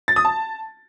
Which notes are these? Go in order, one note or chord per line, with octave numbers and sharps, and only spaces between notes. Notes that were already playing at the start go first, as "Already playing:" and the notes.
A6
D#6
A5